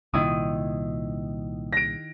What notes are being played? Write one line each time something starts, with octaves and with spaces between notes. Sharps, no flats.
C2 A#2 D#3 E4 D#6
A#6 D7